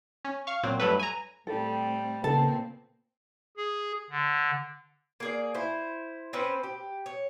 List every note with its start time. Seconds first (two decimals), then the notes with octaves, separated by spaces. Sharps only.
0.25 C#4
0.47 F5 C#6
0.63 A#2 F#3 C4
0.80 G2 F#3 A3 B4
0.99 G#5 A#5
1.47 A2 G3 C4 A4
2.24 A#2 C#3 B3 C4 A4 A5
3.57 G#4
4.11 D3
5.20 A#3 G#4 D5
5.54 E4 C5
6.33 C4 C#4 B4 C5
6.63 G4
7.06 C#5